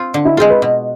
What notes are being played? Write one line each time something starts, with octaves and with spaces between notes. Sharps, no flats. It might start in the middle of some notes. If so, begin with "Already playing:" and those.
Already playing: C4 F4
D3
E4
G#3 C4 F4 G#4
B4
B2